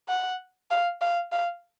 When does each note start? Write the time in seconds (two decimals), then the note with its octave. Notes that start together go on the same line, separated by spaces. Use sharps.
0.08 F#5
0.71 F5
1.01 F5
1.32 F5